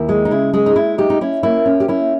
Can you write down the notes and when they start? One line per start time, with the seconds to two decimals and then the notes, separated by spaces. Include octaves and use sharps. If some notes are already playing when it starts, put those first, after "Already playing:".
Already playing: D#2 E4
0.09 G#3
0.25 D#4
0.31 C#3 E4
0.53 G#3 G#4
0.66 D#4
0.75 G#3 E4
0.98 D#4 G4
1.10 D#4
1.21 C#4 E4
1.43 A#3 E4
1.66 C#4
1.80 G4
1.88 C#4 E4